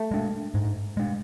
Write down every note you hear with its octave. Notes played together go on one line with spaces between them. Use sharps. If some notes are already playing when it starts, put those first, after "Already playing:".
Already playing: A3
G#3 D4
G#2
G#3 D4